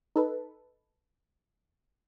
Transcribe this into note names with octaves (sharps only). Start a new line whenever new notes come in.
D#4 A4 B4